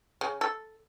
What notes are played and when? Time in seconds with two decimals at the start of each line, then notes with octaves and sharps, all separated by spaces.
0.21 C#3
0.41 A4